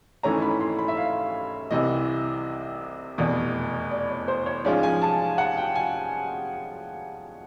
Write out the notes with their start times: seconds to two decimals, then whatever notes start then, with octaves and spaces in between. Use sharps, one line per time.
0.23 G#1 G#2 E3 A3 C#4 A#5
0.42 B5
0.60 C6
0.79 B5
0.88 E5
0.97 F5
1.71 C2 C3 E3 D#5
3.18 F1 E2 B2 D5
3.91 D5
4.10 C#5
4.28 C5
4.46 C#5
4.65 G#2 F3 G#3 C#4 F4 D5
4.83 G#5
5.02 A5
5.38 F#5
5.57 G5
5.75 G#5